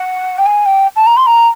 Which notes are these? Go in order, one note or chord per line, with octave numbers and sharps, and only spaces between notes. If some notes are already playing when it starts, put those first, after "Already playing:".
Already playing: F#5
G5
G#5
G5
A5
A#5
C6
A#5